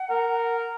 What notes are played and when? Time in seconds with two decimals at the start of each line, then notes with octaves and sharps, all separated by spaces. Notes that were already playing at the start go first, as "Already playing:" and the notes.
Already playing: F#5
0.10 A#4